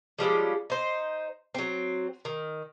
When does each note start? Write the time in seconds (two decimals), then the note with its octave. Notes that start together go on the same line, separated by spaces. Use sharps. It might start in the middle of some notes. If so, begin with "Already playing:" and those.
0.19 F3 G3 G#3 C#4
0.70 D#4 C5
1.54 F#3 C4
2.25 D#3